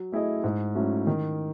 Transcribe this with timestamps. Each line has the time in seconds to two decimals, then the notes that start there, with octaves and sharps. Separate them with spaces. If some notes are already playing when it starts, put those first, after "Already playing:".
Already playing: F#3
0.12 A3 E4 G#4 D#5
0.44 G#2
0.75 F#3 A3 C#4 E4
1.07 D#3